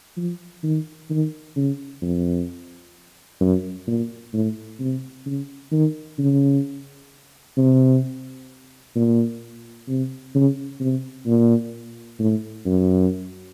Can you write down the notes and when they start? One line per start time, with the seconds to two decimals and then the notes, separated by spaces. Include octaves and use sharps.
0.17 F3
0.64 D#3
1.10 D#3
1.56 C#3
2.02 F2
3.41 F#2
3.88 A#2
4.34 A2
4.80 C3
5.26 C#3
5.72 D#3
6.19 C#3
7.57 C3
8.96 A#2
9.88 C3
10.35 C#3
10.80 C3
11.26 A#2
12.20 A2
12.66 F#2